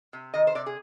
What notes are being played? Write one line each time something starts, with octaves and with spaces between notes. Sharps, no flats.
C3
D#3 D#5
C5
C3 D5
G#4